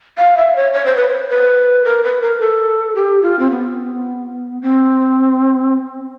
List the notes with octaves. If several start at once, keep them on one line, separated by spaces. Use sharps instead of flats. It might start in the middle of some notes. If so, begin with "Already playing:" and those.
F5
E5
C#5
C#5
C5
B4
C5
B4
A#4
B4
A#4
A4
G4
F4
C4
B3
C4